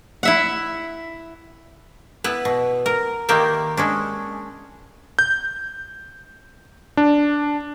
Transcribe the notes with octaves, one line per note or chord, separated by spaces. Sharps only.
E4 E5 F#5
B3 E4 B4
B2
A#4
D#3 A#3 G4 D5 E5
G#3 C#4 D4
G6
D4